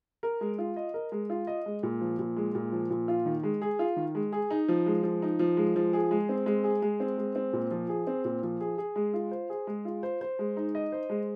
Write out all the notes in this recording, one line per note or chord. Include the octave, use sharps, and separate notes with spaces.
A#4
G#3
F4
D#5
A#4
G#3
F4
D#5
G#3
A#2
F3
A#2
G#3
A#2
F3
A#2
F4
D#3
G#3
G#4
F4
D#3
G#3
G#4
D#4
F3
G#3
F3
D#4
F3
G#3
F3
G#4
G#3
C4
G#3
G#4
G#3
C4
G#3
C4
A#2
F3
G#4
C4
A#2
F3
G#4
G#4
G#3
F4
C5
G#4
G#3
F4
C5
C5
G#3
D#4
D#5
C5
G#3